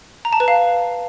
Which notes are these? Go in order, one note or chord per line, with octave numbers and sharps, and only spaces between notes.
A#5
A5
B4
F5